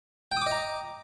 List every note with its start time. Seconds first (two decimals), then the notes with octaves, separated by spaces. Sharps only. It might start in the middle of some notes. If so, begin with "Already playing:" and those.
0.32 G5
0.37 D#6
0.41 D6
0.46 D#5
0.51 A#5